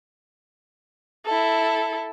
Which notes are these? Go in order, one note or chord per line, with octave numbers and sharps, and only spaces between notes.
E4 A4